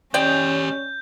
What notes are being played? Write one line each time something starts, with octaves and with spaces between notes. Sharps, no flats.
G#3 C#4 G4 D5 D#5 G5 G6